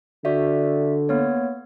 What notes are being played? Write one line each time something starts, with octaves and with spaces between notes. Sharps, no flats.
D3 F#4 D5 E5
A#3 B3 C#5